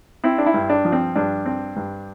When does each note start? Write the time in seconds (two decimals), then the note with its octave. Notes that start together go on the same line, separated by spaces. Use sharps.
0.24 C4 E4
0.38 D4
0.46 E4
0.54 G2
0.70 D4
0.85 F3
0.92 C4
1.16 G2 D4
1.46 C4
1.76 G2